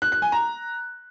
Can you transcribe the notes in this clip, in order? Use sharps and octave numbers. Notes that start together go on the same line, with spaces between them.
F#6
F#6
G#5
A#5